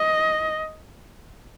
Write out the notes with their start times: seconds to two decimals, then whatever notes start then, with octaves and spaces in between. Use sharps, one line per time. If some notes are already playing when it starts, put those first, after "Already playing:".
Already playing: D#5